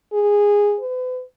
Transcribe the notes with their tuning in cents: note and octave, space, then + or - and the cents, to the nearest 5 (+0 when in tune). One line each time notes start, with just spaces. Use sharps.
G#4 -10
B4 +40